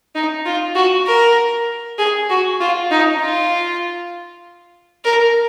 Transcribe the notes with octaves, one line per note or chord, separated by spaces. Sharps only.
D#4
F4
F#4
A#4
G#4
F#4
F4
D#4
F4
A#4